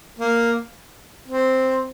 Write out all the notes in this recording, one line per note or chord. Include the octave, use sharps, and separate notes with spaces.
A#3
C4